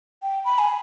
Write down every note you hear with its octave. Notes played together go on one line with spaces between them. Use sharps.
G5
B5
G#5